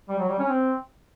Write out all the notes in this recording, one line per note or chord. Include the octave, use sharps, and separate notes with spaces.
G3
F#3
G3
C#4
C4